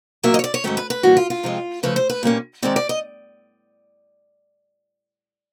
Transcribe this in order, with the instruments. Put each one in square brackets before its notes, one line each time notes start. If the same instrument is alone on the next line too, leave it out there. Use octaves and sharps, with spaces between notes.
[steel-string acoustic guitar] A#2 F#3 A#3 E5
D#5
C#5
D5
C#5
G#2 D#3 F#3 A3 C#4
B4
B4
A2 E3 G3 A#3 F#4
F4
F4
F2 C3 F3 G#3 C4
C#3 F3 A3 B4
C5
B4
A#2 G3 A#3 C#4
D#3 G#3 C4 D5
D5
D#5